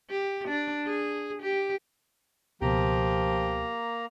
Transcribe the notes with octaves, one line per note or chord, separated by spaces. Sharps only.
G4
D4
G#4
G4
C#2 B2 F3 A#3 G4 A#5